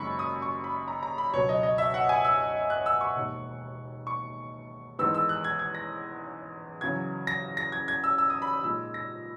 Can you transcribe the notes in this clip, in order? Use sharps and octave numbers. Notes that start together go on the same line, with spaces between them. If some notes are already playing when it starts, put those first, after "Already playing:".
Already playing: F#1 F#2 D#3 G#3 B5 C#6
D#6
C#6
B5
A#5
A#5
B5
C#2 B2 F#3 C#5
D#5
D#5
E5
F#5
G#5
E6
F#6
E6
C#6
E1 D#2 D#3
C#6
E2 D#3 G#3 B3 D#4 E6
E6
F#6
G#6
G#6
A#6
E2 C#3 F#3 G#6
A#6
A#6
G#6
G#6
E6
E6
D#6
B5
D#6
A#2 G#3 D#4 E6
A#6